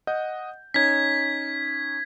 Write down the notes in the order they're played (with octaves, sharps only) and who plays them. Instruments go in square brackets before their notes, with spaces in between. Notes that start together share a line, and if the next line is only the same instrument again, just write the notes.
[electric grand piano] D#5 F#5 G6
[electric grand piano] C#4 D#4 C#5 [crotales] G#6 B6